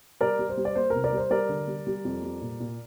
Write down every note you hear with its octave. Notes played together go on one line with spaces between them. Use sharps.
G3 A#4 D5
G3
C5
G3
D5
A#3 C5
C2 A#4
A#4 D5
G3
C5
G3 A#4 D5
D3
G3
G3
F2
G3
A#2
A#2